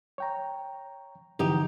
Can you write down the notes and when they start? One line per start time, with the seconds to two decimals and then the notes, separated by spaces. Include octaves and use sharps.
0.18 C#5 G5 A#5
1.39 D3 E3 F3 D#4 G4